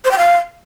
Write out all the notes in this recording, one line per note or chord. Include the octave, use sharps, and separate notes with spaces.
C5
G5
F5